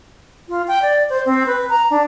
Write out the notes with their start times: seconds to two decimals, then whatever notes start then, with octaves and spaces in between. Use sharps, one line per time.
0.49 F4
0.68 G5
0.82 D5
1.10 C5
1.26 C4
1.46 B4
1.69 A#5
1.90 D4